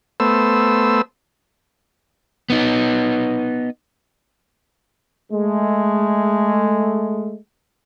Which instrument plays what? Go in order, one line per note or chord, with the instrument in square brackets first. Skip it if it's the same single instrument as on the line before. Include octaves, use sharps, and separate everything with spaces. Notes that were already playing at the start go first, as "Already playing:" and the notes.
[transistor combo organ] A3 B3 C5 E6
[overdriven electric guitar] B3 D#4
[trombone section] G#3 A3